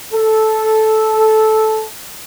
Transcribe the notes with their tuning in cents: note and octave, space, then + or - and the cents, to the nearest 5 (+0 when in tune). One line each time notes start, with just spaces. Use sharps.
A4 -10